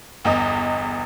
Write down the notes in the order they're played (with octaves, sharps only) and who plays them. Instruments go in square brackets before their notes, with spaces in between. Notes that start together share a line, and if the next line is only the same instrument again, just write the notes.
[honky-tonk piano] G1 E2 D#5